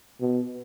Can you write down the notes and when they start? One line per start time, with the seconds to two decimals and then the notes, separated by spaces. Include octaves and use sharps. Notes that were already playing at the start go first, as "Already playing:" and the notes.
0.21 B2